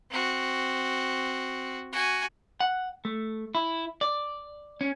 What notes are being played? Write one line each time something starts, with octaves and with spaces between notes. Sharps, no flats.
C4 F#4
F#4 G#5
F#5
A3
E4
D5
C#4